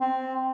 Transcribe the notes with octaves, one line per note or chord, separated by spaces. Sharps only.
C4